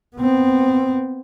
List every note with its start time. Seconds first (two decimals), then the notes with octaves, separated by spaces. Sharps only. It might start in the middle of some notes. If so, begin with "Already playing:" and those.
0.17 B3 C4